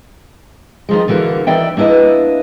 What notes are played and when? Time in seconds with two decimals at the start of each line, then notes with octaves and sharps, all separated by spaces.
0.89 D#3 F3 G#3
1.08 D3 E3 A#3 F#4
1.47 D#3 E3 D5 E5 G5
1.77 A#3 D4 E4 B4 D#5